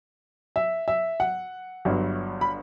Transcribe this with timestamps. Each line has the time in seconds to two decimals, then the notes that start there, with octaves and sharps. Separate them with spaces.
0.56 E5
0.88 E5
1.20 F#5
1.85 G1 G2 F#3
2.41 B5